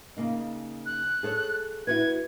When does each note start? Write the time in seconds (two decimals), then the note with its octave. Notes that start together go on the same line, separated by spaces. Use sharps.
0.17 C#3 A#3 D#4
0.86 F#6
1.23 G#4 A4 C#5
1.87 E4 F#4 B4 G#6